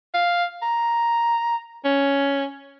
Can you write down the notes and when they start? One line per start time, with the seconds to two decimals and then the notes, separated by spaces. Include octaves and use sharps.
0.14 F5
0.62 A#5
1.85 C#4